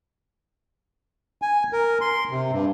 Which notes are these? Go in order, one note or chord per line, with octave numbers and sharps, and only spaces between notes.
G#5
A#4
C6
C3
G2